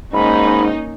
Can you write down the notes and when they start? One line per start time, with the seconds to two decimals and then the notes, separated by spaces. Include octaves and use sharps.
0.14 G#2 A#3 C#4 D#4 B5